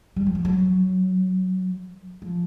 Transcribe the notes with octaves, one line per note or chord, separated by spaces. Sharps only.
G3
F#3
F3
F#3
F3